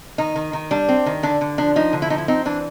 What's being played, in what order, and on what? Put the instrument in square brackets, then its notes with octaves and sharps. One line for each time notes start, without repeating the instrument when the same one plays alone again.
[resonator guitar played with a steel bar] D#3 D#4
D#3
D#3
G3 D4
C4
D#3
D3 D4
D3
F3 D4
F3 D#4
D3
E4
F3 D#4
E4
C4 D#4
E3 D4